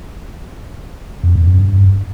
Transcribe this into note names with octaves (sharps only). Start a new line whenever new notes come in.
F2
E2
F#2
G2